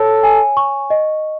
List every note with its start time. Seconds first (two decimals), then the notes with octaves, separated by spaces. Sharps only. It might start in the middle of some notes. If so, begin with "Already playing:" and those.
Already playing: A4 C#5
0.23 G#5
0.57 C#6
0.90 D#5